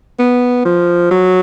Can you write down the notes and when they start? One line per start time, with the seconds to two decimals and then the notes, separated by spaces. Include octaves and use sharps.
0.19 B3
0.65 F3
1.11 F#3